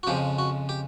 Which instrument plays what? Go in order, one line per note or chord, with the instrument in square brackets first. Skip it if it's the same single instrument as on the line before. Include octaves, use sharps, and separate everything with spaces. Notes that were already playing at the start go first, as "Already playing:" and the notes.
[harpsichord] F#4
F2 C#3 F3 G#3 G4
F#4
G4